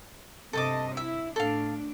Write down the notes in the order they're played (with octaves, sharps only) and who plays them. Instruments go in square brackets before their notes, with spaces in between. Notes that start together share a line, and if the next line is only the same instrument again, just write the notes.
[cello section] G2 C3 D#5 [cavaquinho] A4 A5 D6
[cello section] E4 [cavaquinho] E5
[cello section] A2 D4 [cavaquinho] A4 F5